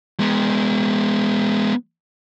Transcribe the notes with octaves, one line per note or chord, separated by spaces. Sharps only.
G#3 B3